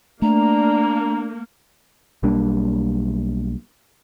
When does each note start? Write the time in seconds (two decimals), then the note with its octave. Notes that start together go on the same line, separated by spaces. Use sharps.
0.22 A3 A#3 D4 A#5
2.23 B1 G3 A#3 D4